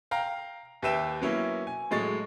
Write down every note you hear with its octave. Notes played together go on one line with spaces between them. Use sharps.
F5 G5 A#5
D#2 G4 B4 E5 G5 E7
F#3 A#3 B3 C#4 E4
G#5
A2 F#3 G#3 C#6 A6